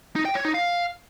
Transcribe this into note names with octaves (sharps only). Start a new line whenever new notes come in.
D#4
G5
C#5
D#4
F5